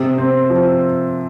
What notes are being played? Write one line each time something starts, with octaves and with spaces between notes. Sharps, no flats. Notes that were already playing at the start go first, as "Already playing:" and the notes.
Already playing: C3
C4
F3